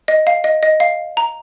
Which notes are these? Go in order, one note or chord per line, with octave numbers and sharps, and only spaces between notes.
D#5
F5
D#5
D#5
F5
A#5